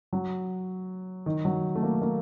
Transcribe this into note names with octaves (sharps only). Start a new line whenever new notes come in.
F#3
D#3
F#3
A3
A#3
A#3